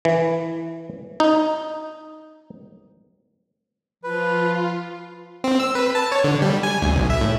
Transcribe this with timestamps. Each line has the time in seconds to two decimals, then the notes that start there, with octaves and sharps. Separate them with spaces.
0.05 E3
1.20 D#4
4.04 F3 F4 B4
5.44 C4
5.60 E6
5.75 B4
5.95 A5
6.12 C#5
6.24 D3
6.42 G3
6.63 G#5
6.82 D2
6.95 B1
7.10 E5
7.21 A2